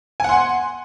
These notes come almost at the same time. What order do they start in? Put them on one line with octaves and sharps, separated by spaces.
G#5 F#5 C6